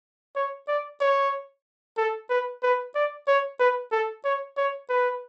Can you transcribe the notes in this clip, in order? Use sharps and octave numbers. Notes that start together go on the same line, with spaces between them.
C#5
D5
C#5
A4
B4
B4
D5
C#5
B4
A4
C#5
C#5
B4